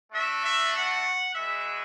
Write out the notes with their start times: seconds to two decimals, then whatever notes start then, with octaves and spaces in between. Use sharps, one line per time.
0.12 A3 D4 F#4 E5
0.43 E5
0.74 F#5
1.35 G#3 B3 F#4 E5